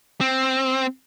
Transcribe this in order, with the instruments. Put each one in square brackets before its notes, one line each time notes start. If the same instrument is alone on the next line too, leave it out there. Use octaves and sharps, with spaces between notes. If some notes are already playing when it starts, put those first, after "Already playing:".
[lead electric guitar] C4